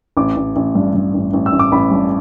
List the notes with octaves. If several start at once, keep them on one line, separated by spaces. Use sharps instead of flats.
A1 D6
A1
A1
G2
G2
A1
A1
E6
A1
D6
A1 B5
G2